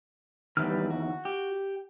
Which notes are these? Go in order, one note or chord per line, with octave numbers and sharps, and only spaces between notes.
E2 D#3 G3 B4 F6
F#4
G4